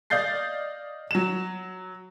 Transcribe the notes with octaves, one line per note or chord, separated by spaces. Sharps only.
D5 D#5 F5 G6 A6 C7
F#3 E7